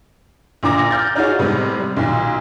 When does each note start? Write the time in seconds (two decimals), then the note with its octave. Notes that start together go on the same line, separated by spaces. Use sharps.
0.63 A#1 A#2 D3 A#5 D6 A#6
0.91 F6 G6 A6
1.15 D4 D#4 F4 F#4 G#4 C#5
1.39 A2 C3 G3 G#3 B3
1.80 G3
1.97 B1 A#2 D#3